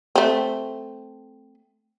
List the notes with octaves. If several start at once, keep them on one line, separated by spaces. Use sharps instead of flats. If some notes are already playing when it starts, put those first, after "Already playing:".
A3 C4